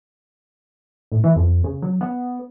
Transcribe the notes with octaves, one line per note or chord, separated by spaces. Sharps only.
A2
E3
F2
C#3
F#3
B3